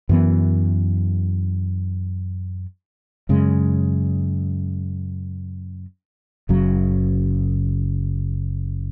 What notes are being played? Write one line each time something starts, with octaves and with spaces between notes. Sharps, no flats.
F#2 E3 B3
F#2 C#3 G#3
F#1 F#2 C#3 F#3